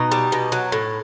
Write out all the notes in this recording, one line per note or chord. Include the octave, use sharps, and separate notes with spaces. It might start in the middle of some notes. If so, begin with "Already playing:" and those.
Already playing: B2 D#4
G3
B2
F#3
A2